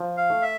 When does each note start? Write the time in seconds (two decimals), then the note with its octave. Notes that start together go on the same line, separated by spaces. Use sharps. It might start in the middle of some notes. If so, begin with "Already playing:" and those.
Already playing: F3
0.17 F5
0.30 A3
0.42 E5